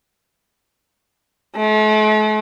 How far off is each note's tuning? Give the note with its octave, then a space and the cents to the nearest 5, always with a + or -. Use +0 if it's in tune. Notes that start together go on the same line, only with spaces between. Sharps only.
A3 -45